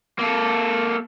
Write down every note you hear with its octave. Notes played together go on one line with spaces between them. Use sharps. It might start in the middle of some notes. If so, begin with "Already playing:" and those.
A#3 A4